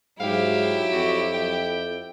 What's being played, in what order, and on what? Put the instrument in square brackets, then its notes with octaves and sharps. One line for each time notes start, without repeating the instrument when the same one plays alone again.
[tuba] G#2 [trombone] F#3 [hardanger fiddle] E4 G4 [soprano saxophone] F5
[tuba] F2 [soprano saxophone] F#4
[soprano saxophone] G5